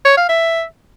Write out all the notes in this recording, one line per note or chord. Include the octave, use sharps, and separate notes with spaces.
C#5
F5
E5